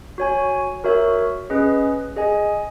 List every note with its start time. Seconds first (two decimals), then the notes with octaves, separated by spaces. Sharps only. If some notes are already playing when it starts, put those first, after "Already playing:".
0.18 F#4 C#5 G#5
0.84 F#4 A#4 C#5 E5
1.50 C#4 G#4 B4 D#5
2.16 G#4 D#5 G#5